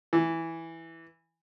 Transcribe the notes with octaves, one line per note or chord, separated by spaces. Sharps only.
E3